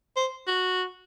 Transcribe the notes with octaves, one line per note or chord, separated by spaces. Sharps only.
C5
F#4